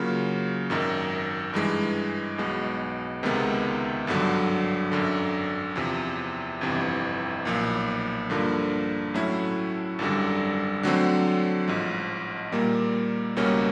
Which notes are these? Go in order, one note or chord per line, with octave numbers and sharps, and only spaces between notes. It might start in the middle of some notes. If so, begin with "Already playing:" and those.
Already playing: C#3 F#3 A#3 C#4 F4
G#1 F#2 D#3
G2 E3 G#3
B1 B2 G#3
C#2 C3 D#3 G#3 B3
G#1 G2 D3 F#3
G#1 F#2 D3
E2 C3 F3
G1 F2 C3 E3
B1 A#2 F3
G2 D3 F3 A#3
A2 F#3 A3 C#4 E4
G#1 F#2 D3 G3
D3 F#3 A3 C4
A1 G#2 F3
A#2 G3 A#3
C#2 B2 G3 A#3 C#4